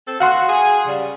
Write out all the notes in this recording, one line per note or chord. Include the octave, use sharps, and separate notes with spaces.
C4 A4
F#4 F5 F#5 C6
G#4
C#3 G3